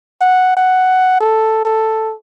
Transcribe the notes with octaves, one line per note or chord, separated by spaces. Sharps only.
F#5
F#5
A4
A4